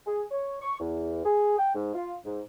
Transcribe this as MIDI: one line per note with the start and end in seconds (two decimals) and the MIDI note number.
0.07 0.22 68
0.31 0.57 73
0.62 0.76 85
0.79 1.24 40
1.25 1.58 68
1.58 1.70 79
1.75 1.92 44
1.94 2.14 65
2.25 2.41 44